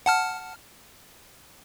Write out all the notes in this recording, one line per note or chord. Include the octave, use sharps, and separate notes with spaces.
F#5 A5 F6